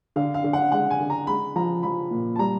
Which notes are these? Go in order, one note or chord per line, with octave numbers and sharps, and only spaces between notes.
D3 F5
F5
D3
F#5
G#3 F#5
G#5
D3
A#5
G#3 B5
F3 A#5
F3 B5
A#2
A5
G3 A#5